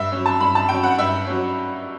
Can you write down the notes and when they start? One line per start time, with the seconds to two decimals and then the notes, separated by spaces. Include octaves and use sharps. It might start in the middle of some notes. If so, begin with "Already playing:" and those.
Already playing: G2 E5
0.12 F#3 C#4
0.26 A5
0.40 G2 B5
0.55 A5
0.69 F#3 C#4 G5
0.83 F#5
0.98 G2 E5
1.26 F#3 C#4